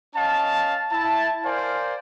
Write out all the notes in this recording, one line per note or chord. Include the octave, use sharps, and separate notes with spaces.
C#4 D#5 F5 A5
E4 A5
A#4 C5 D5 F5 G#5